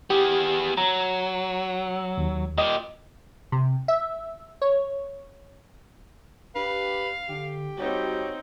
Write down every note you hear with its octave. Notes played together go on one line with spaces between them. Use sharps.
B3 G4 G#4
F#3 A#5
D#2
A#2 G4 D#5
C3
E5
C#5
D4 G4 B4 F5
D3 G4
G3 C4 D#4 F#4 C#5